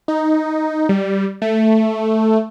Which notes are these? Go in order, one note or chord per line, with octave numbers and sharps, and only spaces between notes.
D#4
G3
A3